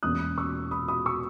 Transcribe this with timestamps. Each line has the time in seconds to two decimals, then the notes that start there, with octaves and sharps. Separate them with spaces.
0.03 E1 E2 B2 A#3 C#4 D#6 F#6
0.38 C#6 E6
0.71 B5 D#6
0.88 B5 D#6
1.06 C#6 E6